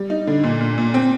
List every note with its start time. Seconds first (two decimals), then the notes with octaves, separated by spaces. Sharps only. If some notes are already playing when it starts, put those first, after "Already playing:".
Already playing: G3
0.10 D#4
0.27 D3
0.43 A#2
0.61 A#2
0.78 A#2
0.94 C4